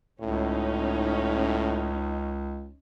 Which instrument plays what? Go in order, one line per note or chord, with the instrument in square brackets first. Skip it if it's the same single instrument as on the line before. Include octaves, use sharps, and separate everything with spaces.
[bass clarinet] C#2 [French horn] A2 [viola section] C#4 D#4